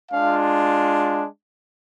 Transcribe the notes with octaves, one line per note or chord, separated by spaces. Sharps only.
G#3 D4 F4 F5